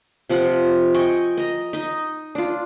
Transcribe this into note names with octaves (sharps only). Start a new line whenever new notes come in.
C3 F3 F4 F#5
D#5 G5 G#5 C#6
D#5 A#5
D#4 D#5
D4 F4